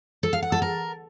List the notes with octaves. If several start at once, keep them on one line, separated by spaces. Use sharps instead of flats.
A4
F5
F#5
A4
A#4